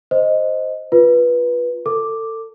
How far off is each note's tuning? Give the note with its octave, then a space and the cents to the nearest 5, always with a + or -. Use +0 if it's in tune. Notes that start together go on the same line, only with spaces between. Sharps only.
C5 +0 D#5 +0
F4 +0 B4 -15
A4 +30 D6 +0